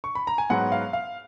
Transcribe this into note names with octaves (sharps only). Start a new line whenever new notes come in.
C#6
B5
A#5
G#5
G#2 F#3 B3 F#5
F5
F5